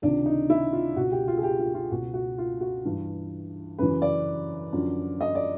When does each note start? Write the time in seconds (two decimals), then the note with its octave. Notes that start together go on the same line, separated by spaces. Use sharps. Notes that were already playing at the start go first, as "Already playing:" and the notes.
0.02 C#2 C3 D#3 D4
0.26 D#4
0.50 E4
0.73 F4
0.96 C#2 B2 F#4
1.12 G4
1.28 F4
1.37 G#4
1.43 G4
1.59 F4
1.74 F4
1.91 C#2 B2 F#4
2.14 F#4
2.38 F4
2.61 F#4
2.85 G2 E3
3.78 F#2 C#3 E3 B4
4.02 D5
4.73 F#2 D3 F3
5.21 D#5
5.35 D5